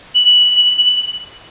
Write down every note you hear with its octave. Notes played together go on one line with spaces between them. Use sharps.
F#7